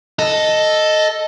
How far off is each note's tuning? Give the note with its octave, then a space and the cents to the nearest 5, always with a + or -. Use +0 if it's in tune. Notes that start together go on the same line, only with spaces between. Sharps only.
A4 +0 D#5 +0